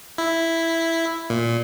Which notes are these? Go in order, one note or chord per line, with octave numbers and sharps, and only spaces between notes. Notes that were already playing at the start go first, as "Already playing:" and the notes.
E4
A#2